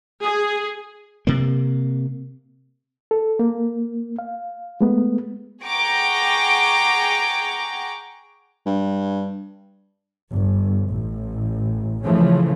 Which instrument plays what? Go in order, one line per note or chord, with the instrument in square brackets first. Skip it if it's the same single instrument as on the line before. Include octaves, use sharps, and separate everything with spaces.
[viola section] G#4
[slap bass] C3 A#3
[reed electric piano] A4
A#3
F5
G#3 A3 B3
[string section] G#4 F#5 G5 A#5 C#6 D6
[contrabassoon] G2
[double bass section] G1
A1
C#3 E3 F3 A3